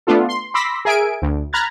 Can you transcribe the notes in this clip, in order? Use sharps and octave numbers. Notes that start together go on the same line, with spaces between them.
A3 B3 D4 F4 A4
C6
B5 C6 D6 E6 A#6 B6
G#4 A#4 E5 G#5 D7
D2
A#5 B5 F6 F#6 G#6 A6